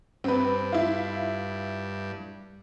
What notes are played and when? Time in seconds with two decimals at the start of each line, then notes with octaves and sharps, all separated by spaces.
0.24 G2 C4 B4
0.73 E4 F4